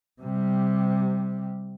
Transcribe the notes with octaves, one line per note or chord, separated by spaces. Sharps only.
C3 G3